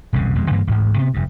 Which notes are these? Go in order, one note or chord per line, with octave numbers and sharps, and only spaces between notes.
E1 C2 F#2 C#3
D#1 F2 B2 G#3
G2 D3 E3 A#3
A1 D2 G#2
C3 B3
F1 G2